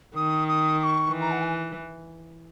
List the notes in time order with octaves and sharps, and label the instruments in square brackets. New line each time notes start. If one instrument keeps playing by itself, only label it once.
[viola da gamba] D#3 [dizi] D#6
[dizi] D#6
D#6
C#6
[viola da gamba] E3
[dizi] A#5
F#5
G#5